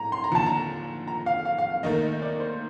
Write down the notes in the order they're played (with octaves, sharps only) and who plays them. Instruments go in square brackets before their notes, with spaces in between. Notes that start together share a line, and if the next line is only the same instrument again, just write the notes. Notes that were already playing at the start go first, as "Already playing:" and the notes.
Already playing: [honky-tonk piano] A2 [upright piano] A#5
[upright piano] C6
A#5
[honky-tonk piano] D#2 D3 F3 [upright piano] A5
[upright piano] A#5
A#5
F5
F5
F5
F5
[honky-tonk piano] D#2 D#3 A3 D#4 A#4 [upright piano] D#5
[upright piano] D#5
D5
C5